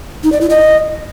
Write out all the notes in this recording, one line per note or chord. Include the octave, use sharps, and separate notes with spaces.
D#4
D5
E4
D#5